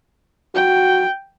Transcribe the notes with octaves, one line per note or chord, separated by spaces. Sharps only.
F#4 G5